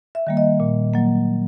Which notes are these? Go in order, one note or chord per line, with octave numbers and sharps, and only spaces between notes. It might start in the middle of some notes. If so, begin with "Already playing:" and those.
E5
D#3 G3 A#3
D#5
A#2
F#3 A#3